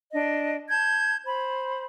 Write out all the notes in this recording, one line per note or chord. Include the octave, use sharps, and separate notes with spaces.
D4 D#5
A5 G6 G#6
C5 B5